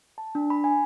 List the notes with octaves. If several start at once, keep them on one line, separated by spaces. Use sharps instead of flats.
A5
D4
B5
G#5